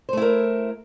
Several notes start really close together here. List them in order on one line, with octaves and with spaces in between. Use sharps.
C5 A3 E4 A#4